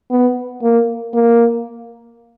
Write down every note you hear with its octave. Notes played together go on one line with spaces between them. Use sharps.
B3
A#3
A#3